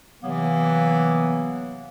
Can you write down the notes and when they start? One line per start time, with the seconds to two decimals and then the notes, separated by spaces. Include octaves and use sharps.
0.21 C3 E3 F#3 A#3 B3